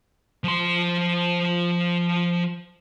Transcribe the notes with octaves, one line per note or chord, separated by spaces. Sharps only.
F3 C6